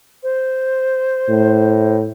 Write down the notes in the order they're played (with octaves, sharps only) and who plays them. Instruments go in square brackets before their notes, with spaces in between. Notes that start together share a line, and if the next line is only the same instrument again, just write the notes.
[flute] C5
[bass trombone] A2